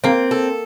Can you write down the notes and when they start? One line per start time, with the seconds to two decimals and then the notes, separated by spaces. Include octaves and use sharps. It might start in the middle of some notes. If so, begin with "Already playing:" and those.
0.04 A#3 C4
0.31 A4